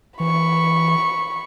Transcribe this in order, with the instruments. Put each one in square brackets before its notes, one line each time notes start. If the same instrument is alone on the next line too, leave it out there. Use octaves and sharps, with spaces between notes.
[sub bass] E3 [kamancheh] B5 C#6